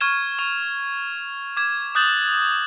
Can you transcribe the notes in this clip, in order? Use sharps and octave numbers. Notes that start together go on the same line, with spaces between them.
C#6 F6 G#6 E7
C#6 F7
D6 G#6 E7
D6 D#6 F#6 G6 A6 F#7